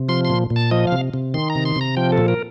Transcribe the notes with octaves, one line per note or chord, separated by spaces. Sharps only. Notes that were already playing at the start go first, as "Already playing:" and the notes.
Already playing: C3
F3 C6
C6
A#2
A#2
A5
F3 D#5
F5
C3
C3
D#3 C6
A#5
C3
C6
C3 A#5
F3 G5
A4
A#2
A#4